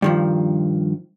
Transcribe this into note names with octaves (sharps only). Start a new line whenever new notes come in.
G2 D#3 F3